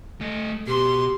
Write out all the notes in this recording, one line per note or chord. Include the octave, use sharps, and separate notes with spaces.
A3 D#5
B2 G4 C6